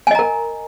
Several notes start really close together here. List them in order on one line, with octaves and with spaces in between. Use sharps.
G#5 D#5 A#5 A#4